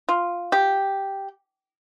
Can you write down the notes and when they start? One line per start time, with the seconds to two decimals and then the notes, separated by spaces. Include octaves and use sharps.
0.09 F4
0.52 G4